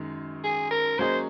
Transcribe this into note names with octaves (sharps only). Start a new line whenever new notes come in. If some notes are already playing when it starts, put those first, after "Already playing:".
Already playing: F#2 D#3 G#3
G#4
A#4
F#3 A#3 C#4 G#4 C5 D#5